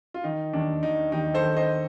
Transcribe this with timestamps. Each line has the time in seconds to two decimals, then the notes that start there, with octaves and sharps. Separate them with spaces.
0.14 F4
0.24 D#3 D#4
0.53 D#2 D4
0.83 D#3 D#4
1.12 D#2 D#4 G4
1.34 A4 C5
1.41 D#3
1.57 C5 D#5